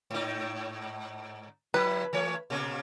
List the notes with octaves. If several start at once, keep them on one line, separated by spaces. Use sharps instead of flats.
G#2 D#4
F3 E4 B4
E3 A3 C#5
A#2 C#3 A#3